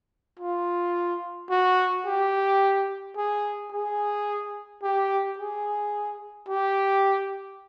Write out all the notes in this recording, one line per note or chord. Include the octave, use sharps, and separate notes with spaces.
F4
F#4
G4
G#4
G#4
G4
G#4
G4